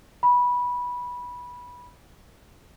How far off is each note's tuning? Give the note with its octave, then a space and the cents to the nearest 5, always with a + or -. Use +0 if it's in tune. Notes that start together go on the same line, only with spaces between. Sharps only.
B5 -15